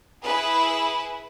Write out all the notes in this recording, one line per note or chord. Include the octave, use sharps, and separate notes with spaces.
E4 G#4 B4